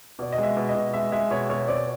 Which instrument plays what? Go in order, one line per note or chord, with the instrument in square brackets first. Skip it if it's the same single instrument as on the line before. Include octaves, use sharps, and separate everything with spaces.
[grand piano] B2 [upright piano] D5
[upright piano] D#5
[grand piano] G#3
[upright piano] E5
[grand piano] B2
[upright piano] D#5
[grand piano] B2
[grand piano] G#3 [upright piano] E5
[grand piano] G#3 [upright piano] E5
[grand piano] B2 [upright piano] C#5
[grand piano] B2 [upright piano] C#5
[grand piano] C4 [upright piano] D5